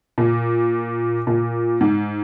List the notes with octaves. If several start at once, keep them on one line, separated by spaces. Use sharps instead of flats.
A#2
A#2
G#2